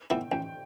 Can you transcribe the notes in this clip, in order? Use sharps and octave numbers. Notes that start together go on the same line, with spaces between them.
A2 E3 B3 E4 G5
A1 G5